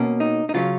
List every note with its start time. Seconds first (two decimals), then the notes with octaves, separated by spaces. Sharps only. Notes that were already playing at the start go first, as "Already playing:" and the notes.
Already playing: B2 A#3 C#4
0.20 D#4
0.49 D#4
0.54 C#3 F#3 C#4 F4